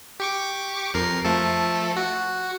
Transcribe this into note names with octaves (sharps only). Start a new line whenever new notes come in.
G4 C#6 D6
F2 A#4 C7
F3 A3 A4
F#4